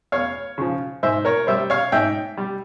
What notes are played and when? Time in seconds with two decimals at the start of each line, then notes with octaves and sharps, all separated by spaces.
0.12 E2 C#5 F5
0.58 C#3 F3
1.03 G#2 C5 E5
1.25 A#4 C#5
1.47 G3 C5 E5
1.70 C#5 F5
1.92 G#2 E5 G5
2.37 G3